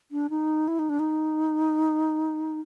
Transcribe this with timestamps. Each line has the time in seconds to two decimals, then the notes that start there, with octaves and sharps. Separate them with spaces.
0.11 D4
0.30 D#4
0.68 E4
0.79 D#4
0.89 D4
0.99 D#4